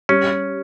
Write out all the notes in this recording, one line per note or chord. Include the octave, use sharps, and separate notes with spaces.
G3 C#4